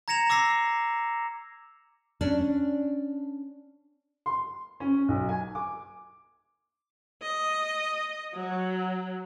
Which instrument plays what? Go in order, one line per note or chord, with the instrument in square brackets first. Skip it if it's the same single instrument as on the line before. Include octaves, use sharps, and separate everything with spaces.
[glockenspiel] A#5 G#6 A#6 C#7 E7 F7
D6 E6 A#6 C7
[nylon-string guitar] C#4 D4
[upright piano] C6
C#4
B1
G#5
D6
[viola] D#5
F#3